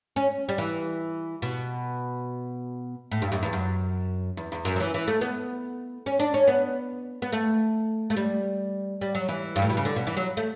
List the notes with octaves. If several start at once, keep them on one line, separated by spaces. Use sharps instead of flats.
C#4
G3
E3
B2
A2
G2
F#2
E2
F#2
E2
E2
F#2
F#3
E3
E3
A3
B3
C#4
D4
C#4
B3
B3
A3
A3
G3
G3
F#3
E3
G2
A2
B2
C#3
D3
B2
E3
F#3
A3